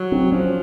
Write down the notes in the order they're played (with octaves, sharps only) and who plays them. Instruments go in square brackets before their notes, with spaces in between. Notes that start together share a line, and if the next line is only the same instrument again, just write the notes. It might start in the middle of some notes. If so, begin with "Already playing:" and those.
Already playing: [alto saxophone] F#3
[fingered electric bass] C4
[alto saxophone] F3 [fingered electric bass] C#4